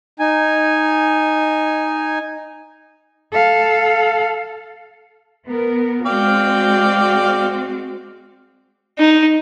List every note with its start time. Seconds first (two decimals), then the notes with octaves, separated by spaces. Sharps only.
0.19 D#4 G#5
3.32 A4 F5
5.47 B3 A#4
6.06 G#3 C4 F#4 D5 F5 G5
8.98 D#4